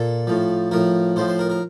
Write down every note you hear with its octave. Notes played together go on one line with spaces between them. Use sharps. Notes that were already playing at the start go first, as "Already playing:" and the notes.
Already playing: A#2 A4
A2 F3
A2 F3 A#4
A2 F3 C5
C5
A#4
A#4